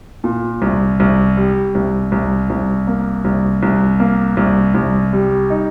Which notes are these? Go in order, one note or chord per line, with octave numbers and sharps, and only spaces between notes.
A#2
C2
C2
G3
C2
C2
C2
A#3
C2
C2
A#3
C2
C2
G3
D#4